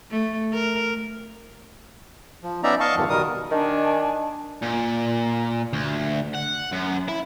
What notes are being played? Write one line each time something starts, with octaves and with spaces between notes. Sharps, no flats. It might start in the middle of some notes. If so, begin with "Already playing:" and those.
A3
A#4
F3
B3 C#4 D#4 D5 E5 A#5
D#5 F5 A5 C#6
E2 G2 D3 D#3 F3
B2 D#3 G3 A#4 D#6
D#3 D4 G#5
A#2
D2
F#5
F#2
E4